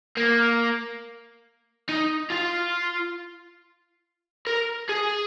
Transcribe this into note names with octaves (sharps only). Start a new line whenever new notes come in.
A#3
D#4
F4
A#4
G#4